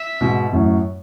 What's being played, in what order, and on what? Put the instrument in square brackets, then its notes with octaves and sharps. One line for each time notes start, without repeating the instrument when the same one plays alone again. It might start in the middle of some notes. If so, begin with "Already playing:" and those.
Already playing: [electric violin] E5
[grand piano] G#2 B2
F#2 A2